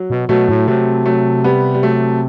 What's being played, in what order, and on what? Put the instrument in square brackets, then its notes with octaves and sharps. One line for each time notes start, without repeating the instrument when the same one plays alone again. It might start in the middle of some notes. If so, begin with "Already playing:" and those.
Already playing: [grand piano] F#3
[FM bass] B2
[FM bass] B2 [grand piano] F#3 A3
[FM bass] A2
[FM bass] C3 [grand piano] F#3 A3
[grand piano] F#3 A3
G3 B3
G3
F#3 A3